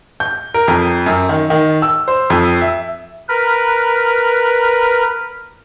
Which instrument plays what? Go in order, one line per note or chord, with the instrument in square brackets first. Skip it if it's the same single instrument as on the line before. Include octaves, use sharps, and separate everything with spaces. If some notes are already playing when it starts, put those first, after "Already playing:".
[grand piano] G6
A#4
F2
F#2
D#3
D#3
E6
C5
F2
E5
[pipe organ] A#4 B4